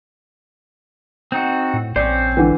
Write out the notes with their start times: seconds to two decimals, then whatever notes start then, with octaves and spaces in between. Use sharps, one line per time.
1.32 C4 D#4 F#4
1.74 A2
1.96 A#1 C4 C#4 C5 D5
2.37 D3 E3